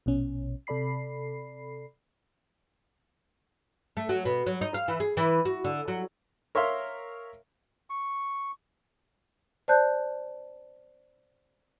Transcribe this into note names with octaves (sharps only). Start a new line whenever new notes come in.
A#1 B2 C#4
C3 A4 D5 B5 C7
A3
F#3
B2
F#3
D#4
F5
E3
G#4
E3
F#4
D3
F#3
A#4 C#5 E5 F5 C6
C#6
C5 D5 A5 F#6 G6